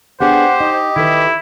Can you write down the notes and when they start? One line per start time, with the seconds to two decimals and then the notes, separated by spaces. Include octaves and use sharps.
0.21 B3 D4 G4 G#4 C5 F#5
0.60 D#4 D#5
0.96 D#3 E4 A4 B4